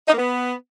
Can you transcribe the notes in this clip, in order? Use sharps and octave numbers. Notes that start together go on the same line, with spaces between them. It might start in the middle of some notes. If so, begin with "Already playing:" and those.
D#4
A#3
B3